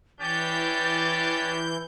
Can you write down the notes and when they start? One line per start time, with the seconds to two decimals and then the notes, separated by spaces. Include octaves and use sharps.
0.20 E3 C#4 D4 G4 G6 A6